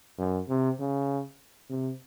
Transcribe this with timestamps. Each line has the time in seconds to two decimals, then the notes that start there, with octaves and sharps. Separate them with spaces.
0.18 F#2
0.49 C3
0.80 C#3
1.70 C3